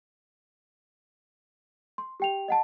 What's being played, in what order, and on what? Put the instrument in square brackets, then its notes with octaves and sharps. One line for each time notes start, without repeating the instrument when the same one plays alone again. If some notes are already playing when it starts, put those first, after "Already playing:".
[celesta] C6
G4 G5 F7
D#5 F#5 A5